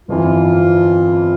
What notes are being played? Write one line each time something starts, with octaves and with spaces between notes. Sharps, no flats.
G1 F2 E3 F4